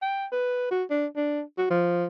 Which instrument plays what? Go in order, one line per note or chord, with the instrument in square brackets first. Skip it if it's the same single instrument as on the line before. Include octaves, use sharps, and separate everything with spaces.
[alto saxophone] G5
B4
F#4
D4
D4
F#4
F3